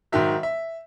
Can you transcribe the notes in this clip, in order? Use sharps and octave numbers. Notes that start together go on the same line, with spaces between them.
G#2 D#3 F#3 E5
E5